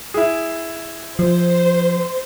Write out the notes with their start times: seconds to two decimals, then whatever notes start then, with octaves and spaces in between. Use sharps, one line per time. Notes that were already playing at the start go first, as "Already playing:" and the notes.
0.14 E4 G#4
1.19 F3 C5